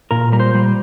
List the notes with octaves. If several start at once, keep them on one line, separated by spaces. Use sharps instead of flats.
A#2 A#4
G3 A#4
C5
G3